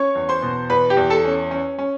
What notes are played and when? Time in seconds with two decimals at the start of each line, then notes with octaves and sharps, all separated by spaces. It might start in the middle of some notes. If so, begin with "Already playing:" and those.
Already playing: C#4 C#5 C#6
0.15 E2
0.29 C5 C6
0.42 B2
0.69 E2 B4 B5
0.90 G4 G5
0.97 E2
1.10 A4 A5
1.25 C#4
1.51 C#4
1.79 C#4